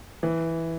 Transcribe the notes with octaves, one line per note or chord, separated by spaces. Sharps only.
E3